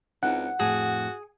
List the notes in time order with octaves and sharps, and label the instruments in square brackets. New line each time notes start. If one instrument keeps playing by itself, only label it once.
[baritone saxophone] C#2 [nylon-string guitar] C4 D#4 E4 [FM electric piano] F#5
[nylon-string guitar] F2 A2 A5 [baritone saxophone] F#4 [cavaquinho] G#4